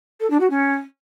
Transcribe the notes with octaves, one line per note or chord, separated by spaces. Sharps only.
A4
D4
F#4
C#4